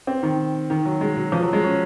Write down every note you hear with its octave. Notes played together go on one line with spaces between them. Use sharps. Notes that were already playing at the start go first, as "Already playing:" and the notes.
C4
D#3
D#3
F#3
G#3
F#3
F3
F#3
G#3
C#4